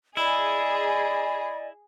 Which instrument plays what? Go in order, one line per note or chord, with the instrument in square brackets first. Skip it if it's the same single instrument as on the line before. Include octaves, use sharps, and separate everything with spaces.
[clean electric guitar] E4 [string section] G#4 [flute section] D5 D#5 G#5 [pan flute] B5